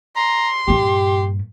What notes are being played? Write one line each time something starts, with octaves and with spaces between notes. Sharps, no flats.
A#5 C6
G2 A#2 G4